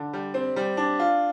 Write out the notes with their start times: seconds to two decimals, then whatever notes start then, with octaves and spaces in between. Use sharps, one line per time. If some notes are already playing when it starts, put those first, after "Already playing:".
Already playing: D3
0.13 G3
0.34 C4
0.56 G3
0.77 D4
0.99 F4